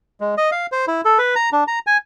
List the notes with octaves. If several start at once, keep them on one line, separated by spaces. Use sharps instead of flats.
G#3
D#5
F5
C5
E4
A4
B4
A#5
D4
A#5
G#5